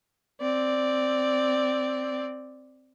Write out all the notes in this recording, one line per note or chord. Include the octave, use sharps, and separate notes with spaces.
C4 D5